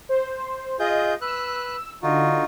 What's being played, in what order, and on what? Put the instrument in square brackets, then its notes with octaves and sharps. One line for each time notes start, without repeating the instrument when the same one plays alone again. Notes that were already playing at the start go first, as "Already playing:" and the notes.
[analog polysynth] C5
[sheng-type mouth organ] F4 G#4 G6 [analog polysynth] D#5
[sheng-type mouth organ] B4 F#6 [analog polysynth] E6
[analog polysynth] D3 [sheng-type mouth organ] D#4 F4 F#4